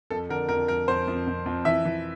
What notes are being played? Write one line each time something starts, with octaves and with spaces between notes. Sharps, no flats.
F2 A4
D3 A#4
F2 A#4
F2 A#4
F2 C5
F2
F2
F2
E3 E5
E3